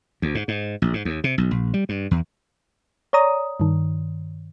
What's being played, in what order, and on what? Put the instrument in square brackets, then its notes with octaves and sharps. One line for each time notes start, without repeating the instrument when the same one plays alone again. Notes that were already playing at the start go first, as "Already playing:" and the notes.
[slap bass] D2
G#2
G#2
A#1
G#2
D#2
C3
B1
A#1
G3
G2
E2
[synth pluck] C#5 D5 A#5 D#6
G2 D#3